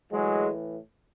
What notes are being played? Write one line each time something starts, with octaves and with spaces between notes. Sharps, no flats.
A2 E3 F#3 G#3